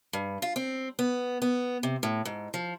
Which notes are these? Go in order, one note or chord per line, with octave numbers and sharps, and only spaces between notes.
G2
F4
C4
B3
B3
C3
A2
G#2
F3